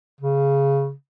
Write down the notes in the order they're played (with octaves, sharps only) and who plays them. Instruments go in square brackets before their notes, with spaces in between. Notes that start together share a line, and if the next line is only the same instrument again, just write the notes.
[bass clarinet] C#3